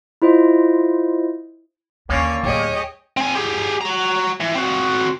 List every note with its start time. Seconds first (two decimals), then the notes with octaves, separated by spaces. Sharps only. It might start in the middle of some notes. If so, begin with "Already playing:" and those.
0.22 E4 F4 C5 D#5
2.09 D#2 D3 A#3 C#4 C#5
2.43 D1 G4 G#4 C#5 D#5
3.17 C4 G#5
3.36 G4 G#4
3.81 F#4 A#5
4.41 E3
4.55 C4 F#4